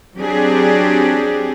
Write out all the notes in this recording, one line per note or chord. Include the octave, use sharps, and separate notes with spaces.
F#3 C4 D4 G4 G#4